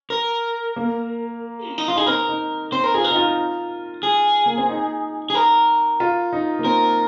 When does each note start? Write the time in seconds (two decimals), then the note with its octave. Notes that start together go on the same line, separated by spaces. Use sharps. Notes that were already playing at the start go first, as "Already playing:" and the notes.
0.10 A#4
0.76 A#3
1.68 C4
1.78 D#4
1.88 F4
1.95 D#4 G#4
2.07 C4 A#4
2.29 D#4
2.72 C4 C5
2.84 A#4
2.94 F4 G#4
3.04 A#4
3.11 D#4
3.16 F4
4.03 G#4
4.46 A#3
4.58 C4
4.69 D#4
5.30 G#4
5.35 A#4
6.00 F4
6.33 D#4
6.59 A#3
6.65 C4 A#4